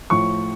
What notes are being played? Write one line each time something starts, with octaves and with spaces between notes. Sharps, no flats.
A2 F3 C#6